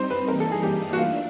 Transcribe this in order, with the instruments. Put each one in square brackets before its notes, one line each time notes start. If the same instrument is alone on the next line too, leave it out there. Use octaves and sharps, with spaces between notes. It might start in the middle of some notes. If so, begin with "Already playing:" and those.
Already playing: [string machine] G3 C4 D#4 [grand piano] C5
[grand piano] B4
[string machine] E3 G3 A#3 D#4 [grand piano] A#4
[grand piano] A4
G#4
G4
F#4
[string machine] A3 D4 [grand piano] F4